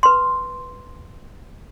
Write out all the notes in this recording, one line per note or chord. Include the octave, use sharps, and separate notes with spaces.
B4 C6